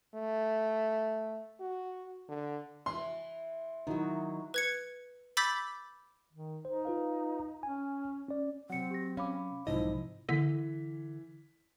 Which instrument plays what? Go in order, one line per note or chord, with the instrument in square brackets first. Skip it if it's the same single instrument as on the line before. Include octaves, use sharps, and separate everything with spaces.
[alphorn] A3
F#4
D3
[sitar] E3 [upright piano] C6
[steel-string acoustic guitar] D#3 F#3 [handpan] D#4 E4 F#4
[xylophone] B4 G#6 C#7
B5 D6 E6 G6 A6 B6
[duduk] D#3
[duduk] D#4 [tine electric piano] C5
[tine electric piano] F4 B4 F5
[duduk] C#4 [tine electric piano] G#5
[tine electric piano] C#4 D5
[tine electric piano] C3 F#3 [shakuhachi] C4 [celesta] F#5 C#7
[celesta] G4 A#6
[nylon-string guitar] C#4 [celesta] F5 B5 D6
[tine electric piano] B1 G#2 F3 [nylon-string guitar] C3 D#5 [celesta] D#4 [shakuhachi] E4
[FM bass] D3 [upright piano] E3 B6